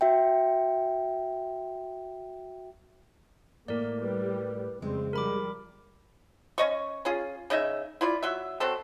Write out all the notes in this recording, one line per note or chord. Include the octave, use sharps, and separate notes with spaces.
F#4 E5 G5
A2 A#3 A#4 D5
G3 B4
F2 C#3 G3 G#3 C4
F3 G3 A#4 B5 D6
C#4 D#5 C#6
C#4 F4 G#4
C#3 D#4 D#5 E5
E4 F4 D5
F#3 E5
F#3 A3 C4 A4